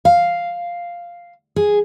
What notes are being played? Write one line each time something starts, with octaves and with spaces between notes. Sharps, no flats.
F5
G#4